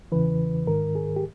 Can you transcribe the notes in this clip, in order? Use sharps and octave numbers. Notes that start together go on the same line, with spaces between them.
E2 C#3 E3 B4
G#2 D#3 A#4
G#4
G4